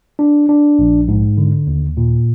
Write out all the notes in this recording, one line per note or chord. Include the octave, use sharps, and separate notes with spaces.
D4
D4
A#1
G#2
D3
D#2
A#2